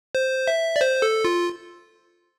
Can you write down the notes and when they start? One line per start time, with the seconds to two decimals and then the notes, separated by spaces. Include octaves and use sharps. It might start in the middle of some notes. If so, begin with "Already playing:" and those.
0.15 C5
0.47 E5
0.76 D5
0.81 C5
1.02 A4
1.25 F4